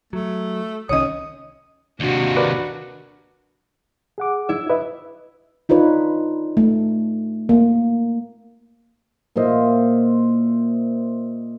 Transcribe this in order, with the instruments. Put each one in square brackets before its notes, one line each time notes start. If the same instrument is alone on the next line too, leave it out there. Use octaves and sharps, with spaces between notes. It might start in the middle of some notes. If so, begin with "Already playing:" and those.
[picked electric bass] F#3 [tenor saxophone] A3
[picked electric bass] C2 D#3 C#4 [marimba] C#5 D#5 [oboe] D#6
[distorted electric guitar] D#2 C3 [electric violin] D4 F#4
[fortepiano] A#4 B4 D5
[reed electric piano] G#4 F#5 D6
[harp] E4 E5
[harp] E4 [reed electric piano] B4 D#5 E5
[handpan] D4 D#4 F4 B4 C#5
A3
A#3
[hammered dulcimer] A#2 E4 C5 D#5